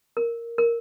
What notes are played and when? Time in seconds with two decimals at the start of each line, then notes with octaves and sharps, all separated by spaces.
0.17 A#4
0.58 A#4